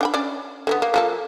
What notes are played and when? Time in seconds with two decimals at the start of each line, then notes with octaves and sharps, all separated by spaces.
0.01 D4 G5 B5
0.14 C#4 D4 D5
0.67 D3 F#3 B3
0.82 A#3
0.94 F3 A#3 A4